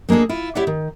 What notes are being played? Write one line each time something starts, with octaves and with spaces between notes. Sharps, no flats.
G#3 A#3 D4 G#4 A4
E4 F4
E4 G4 C#5 D5 E5 F#5
D#3